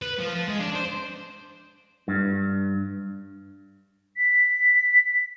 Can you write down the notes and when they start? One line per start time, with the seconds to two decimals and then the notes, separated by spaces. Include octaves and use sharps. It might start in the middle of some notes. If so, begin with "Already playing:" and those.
0.02 B4
0.19 F3
0.35 F3
0.49 G#3
0.60 D4
0.75 C5
2.08 G2
4.17 B6